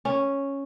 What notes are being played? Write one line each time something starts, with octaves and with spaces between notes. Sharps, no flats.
C#4